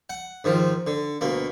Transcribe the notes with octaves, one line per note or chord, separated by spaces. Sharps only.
F#5
G#2 D#3 F3
D3
D2 B2 A#3